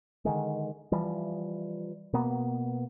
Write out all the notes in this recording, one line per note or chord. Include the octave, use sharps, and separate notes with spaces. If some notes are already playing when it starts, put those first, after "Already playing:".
D3 D#3 G#3
E3 F3 G3
B2 A#3 B3